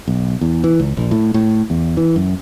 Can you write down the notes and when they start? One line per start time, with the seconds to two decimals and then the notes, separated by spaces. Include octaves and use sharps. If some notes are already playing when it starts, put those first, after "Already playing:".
0.08 B1
0.41 E2
0.64 E3
0.80 C#2
0.97 A#1
1.11 A2
1.34 A2
1.70 E2
1.97 E3
2.16 F#2